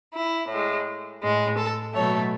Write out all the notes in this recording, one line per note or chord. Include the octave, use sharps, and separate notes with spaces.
E4
A2 G#3
A2 G#3
A4
B2 F#3 A3 C#5